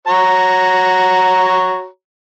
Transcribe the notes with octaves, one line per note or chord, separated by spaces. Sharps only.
F#4 C#5 A#5